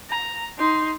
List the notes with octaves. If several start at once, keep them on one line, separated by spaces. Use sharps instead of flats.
A#5
D#4 C6